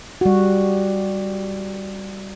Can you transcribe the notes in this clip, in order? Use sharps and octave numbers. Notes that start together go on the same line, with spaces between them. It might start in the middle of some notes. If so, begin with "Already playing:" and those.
G3 F#4